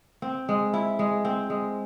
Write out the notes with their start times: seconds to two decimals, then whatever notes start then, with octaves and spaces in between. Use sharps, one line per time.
0.22 C4
0.49 G#3
0.74 E4
0.99 G#3
1.25 C4
1.50 G#3